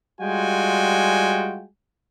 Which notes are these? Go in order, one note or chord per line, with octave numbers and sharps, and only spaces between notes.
G3 G#3 F4 F#4 G5 G#5